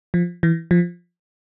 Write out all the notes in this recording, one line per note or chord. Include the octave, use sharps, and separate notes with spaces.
F3
E3
F3